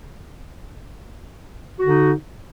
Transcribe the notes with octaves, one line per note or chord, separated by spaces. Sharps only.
D3 D#4 F#4